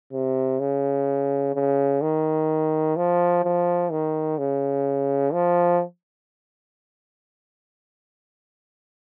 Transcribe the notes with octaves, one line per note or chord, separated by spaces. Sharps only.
C3
C#3
C#3
D#3
F3
F3
D#3
C#3
F3